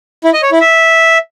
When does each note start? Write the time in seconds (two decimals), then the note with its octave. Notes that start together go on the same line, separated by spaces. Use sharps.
0.24 E4
0.34 D#5
0.43 C#5
0.52 E4
0.61 E5